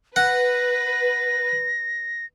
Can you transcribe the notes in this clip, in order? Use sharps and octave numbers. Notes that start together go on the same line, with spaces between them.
B4 F#5 A#6